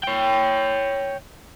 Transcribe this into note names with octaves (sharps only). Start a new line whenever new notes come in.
C#5 G5